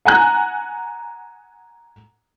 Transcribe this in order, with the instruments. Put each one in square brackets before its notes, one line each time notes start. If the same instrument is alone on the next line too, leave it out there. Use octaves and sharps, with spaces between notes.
[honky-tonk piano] F#5 G#5 A#5 F#6